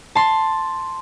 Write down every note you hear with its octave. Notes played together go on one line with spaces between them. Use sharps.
A5 C6